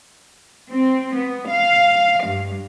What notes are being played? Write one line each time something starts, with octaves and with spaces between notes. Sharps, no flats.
C4
B3
F5
G2